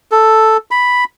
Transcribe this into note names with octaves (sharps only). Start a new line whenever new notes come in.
A4
B5